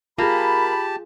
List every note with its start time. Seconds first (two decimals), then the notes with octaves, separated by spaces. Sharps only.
0.18 A#3 F4 G4 G#4 A5 B5